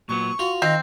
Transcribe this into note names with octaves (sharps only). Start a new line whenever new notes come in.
A#2 F#3 B3 C#6
F4 F#4
D#3 C4 D#5